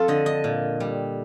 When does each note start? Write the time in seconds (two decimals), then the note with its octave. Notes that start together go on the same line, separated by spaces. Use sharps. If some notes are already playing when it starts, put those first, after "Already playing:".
Already playing: F2 F4 A4
0.08 D3 D#5
0.26 D#5
0.44 A#2
0.80 G3